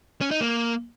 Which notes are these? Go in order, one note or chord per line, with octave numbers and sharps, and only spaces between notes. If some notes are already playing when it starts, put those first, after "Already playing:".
C#4
D#4
A#3